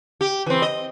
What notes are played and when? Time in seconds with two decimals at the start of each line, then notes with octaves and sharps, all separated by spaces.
0.21 G4
0.46 E3 C4
0.62 D#5